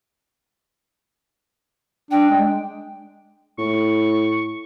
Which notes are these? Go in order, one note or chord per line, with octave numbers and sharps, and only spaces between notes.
D4 G5
G#3
A2 C#6